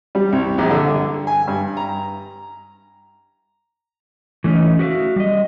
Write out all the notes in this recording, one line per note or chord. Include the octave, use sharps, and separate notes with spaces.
G3
C2
A#1
D3
G2
G#5
G2
A#5
E3 A3 C4 C#4 D#4
F#4 G4 A#4 E5 F5
G3 D#5